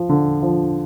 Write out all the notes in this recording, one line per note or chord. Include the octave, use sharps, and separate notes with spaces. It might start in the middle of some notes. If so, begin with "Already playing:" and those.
Already playing: F3
D3
F3